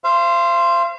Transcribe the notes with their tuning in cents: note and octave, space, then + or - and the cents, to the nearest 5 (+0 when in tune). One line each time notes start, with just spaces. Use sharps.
C5 +0 F5 -40